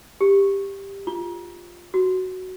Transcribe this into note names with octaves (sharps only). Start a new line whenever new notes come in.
G4
F4
F#4